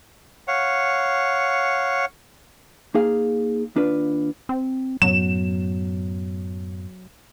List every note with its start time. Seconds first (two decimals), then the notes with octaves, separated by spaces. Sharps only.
0.48 C#5 F5 F#5
2.95 A#3 D#4 G#4 F5
3.76 D#2 D4 F4 B4
4.49 C4
5.02 F#2 A2 F#3 B3 E7